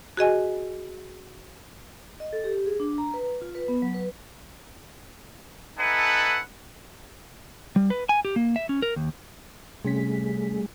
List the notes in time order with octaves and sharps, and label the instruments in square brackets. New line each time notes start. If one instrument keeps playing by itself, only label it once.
[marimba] F#4 G#4 D#5 G#5
[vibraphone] D#5
A4
G4
G#4
D4
A#5
B4
F4
B4
B3
F#3
B4
[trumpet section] A3 D#4 A4 B4 F#5 G#5
[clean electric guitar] G3
B4
G#5
G4
A#3
E5
C#4
A#4
D#2
[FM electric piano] C3 C#4 B6 [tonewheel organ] G3 A3 G#4